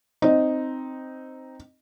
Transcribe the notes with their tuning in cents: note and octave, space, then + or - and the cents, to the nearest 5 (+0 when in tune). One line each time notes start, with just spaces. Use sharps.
C4 +0 D#4 -5